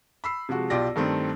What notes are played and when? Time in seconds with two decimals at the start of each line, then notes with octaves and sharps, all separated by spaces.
0.24 B5 E6 C7
0.49 C3 F3 G#3 F#4
0.70 B1 F4 G4 D5 A#6
0.96 G2 D#3 A3 C4